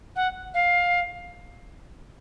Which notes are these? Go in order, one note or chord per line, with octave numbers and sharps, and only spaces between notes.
F#5
F5